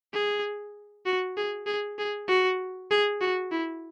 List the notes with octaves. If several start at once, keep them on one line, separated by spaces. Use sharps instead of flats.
G#4
F#4
G#4
G#4
G#4
F#4
G#4
F#4
E4